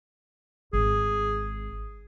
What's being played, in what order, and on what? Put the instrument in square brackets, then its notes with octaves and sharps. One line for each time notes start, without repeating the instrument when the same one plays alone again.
[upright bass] G#1 [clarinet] G#4